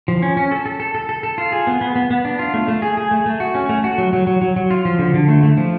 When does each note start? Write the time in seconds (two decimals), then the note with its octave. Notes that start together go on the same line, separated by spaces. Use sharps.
0.08 F3
0.22 C#4
0.37 C#4
0.51 A4
0.66 A4
0.80 A4
0.95 A4
1.09 A4
1.23 A4
1.38 F4
1.52 G#4
1.67 B3
1.81 B3
1.96 B3
2.11 B3
2.25 D4
2.39 F4
2.54 A3
2.68 A3
2.82 G#4
2.97 G#4
3.11 A3
3.26 A3
3.40 F#4
3.55 C#4
3.69 A3
3.84 F#4
3.98 F#3
4.13 F#3
4.27 F#3
4.42 F#3
4.56 F#3
4.71 F4
4.85 F3
4.99 D3
5.14 D3
5.28 A3
5.43 A3
5.57 F3